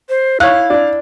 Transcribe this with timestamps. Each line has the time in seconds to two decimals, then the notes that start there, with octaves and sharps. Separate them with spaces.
0.09 C5
0.40 E4 C#5 F5 F#6
0.70 D4